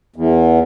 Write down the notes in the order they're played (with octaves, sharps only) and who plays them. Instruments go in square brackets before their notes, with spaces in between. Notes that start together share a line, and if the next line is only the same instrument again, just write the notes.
[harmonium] E2